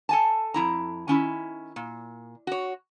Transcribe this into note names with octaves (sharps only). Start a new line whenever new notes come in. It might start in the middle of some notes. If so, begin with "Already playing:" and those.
A4 G#5 A5
F2 E4 A#5
D#3 C#4 E4
A#2
F#4 C#5